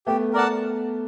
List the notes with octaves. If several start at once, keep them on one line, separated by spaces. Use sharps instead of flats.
A3 B3 G4
A#4 D5 F#5 A5